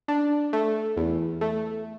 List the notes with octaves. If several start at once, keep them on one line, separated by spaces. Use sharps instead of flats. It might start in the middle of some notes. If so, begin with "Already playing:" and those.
D4
A3
E2
A3